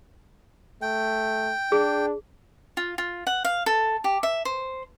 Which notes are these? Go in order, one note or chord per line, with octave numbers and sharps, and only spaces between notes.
A3 G5
D4 G#4
F4
F4
F#5
F5
A4
G4
E5
C5